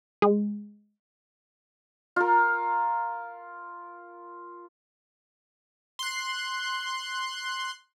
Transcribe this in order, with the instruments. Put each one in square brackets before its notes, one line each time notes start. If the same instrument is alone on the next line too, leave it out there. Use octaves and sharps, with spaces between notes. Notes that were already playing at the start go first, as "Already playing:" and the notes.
[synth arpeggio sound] G#3
[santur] F4 A#4
[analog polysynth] C6 F#6